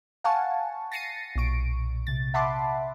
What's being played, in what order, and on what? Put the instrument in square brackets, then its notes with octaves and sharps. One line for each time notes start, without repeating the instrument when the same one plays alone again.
[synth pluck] F5 F#5 G#5 A5 C#6
A6 A#6 C7 C#7 D#7
B1 A#2 C#6 D7
C3 A6
E5 F#5 A5 B5 C6 D6